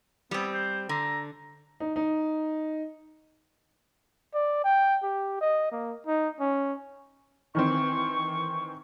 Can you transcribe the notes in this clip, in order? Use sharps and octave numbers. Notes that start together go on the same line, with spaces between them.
G3 B3 C4
C5
D3 A#5
D#4
D#4
D5
G5
G4
D#5
A#3
D#4
C#4
D#3 E3 C4 C#6